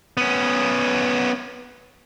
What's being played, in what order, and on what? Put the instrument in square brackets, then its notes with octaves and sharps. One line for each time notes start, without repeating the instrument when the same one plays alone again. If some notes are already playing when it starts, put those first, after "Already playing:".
[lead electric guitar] B3 C#4